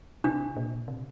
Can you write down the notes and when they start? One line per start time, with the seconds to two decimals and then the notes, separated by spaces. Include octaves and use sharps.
0.24 C3 D4
0.56 A#2
0.88 C3